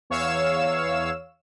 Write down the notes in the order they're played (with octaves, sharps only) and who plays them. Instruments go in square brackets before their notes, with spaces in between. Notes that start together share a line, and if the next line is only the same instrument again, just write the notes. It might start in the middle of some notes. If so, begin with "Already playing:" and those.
[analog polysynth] E2 C#5 F5 E6 E7